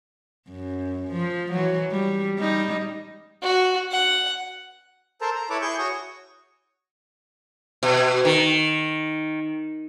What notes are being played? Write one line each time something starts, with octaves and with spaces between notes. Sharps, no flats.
F#2
F3
E3 F#3
G3
G3 D#4
F#4
F#5
A4 A#4 C5 A5 A#5
A#5
E4 A4 B4 C#5 A5 D6
E4 G#4 C#6 G6
F#4 C#5 C#6 D#6
B2
D#3